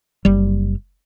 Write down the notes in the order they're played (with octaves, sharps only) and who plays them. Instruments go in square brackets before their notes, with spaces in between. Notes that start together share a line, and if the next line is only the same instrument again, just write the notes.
[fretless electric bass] F#1 G3